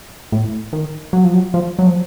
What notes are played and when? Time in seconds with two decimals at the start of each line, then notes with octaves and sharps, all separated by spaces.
0.32 A2
0.73 D#3
1.13 F#3
1.24 F3
1.34 F#3
1.54 F3
1.79 F#3
1.87 F3